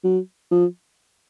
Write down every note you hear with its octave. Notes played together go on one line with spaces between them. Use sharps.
F#3
F3